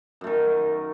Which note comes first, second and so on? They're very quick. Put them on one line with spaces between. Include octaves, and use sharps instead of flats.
F#2 A3 D#3